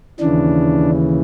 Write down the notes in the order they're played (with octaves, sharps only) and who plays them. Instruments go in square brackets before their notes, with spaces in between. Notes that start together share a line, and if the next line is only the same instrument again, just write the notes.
[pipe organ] D#2 C#3 E3 D4